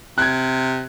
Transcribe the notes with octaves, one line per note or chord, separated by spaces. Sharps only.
C3 F#6 G#6